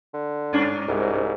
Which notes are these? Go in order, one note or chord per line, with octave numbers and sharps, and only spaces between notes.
D3
G2 C#4 D4
C2 G#2